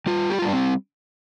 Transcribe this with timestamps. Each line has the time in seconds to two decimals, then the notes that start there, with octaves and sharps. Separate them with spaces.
0.06 G3 F4
0.30 G4
0.39 F4
0.42 G3 D4
0.53 C4